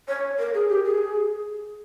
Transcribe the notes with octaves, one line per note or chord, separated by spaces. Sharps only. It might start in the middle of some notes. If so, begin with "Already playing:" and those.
C#5
A#4
G#4
G4
G#4